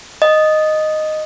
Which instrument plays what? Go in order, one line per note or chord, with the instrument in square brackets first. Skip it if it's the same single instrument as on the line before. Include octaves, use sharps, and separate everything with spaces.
[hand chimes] D#5